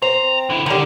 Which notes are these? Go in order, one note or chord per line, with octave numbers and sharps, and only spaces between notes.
C4 A#5
D3 E4
D3 D#3 G3